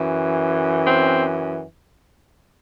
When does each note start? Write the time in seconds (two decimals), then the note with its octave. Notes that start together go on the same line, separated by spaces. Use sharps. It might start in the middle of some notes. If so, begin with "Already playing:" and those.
Already playing: F#2 E3
0.85 C4